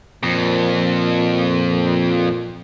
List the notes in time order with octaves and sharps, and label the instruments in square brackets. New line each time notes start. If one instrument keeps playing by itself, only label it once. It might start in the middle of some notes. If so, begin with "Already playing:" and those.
[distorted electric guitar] F2 [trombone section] A#2